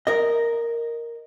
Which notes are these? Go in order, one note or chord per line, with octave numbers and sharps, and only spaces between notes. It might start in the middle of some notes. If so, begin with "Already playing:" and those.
A#4 D#5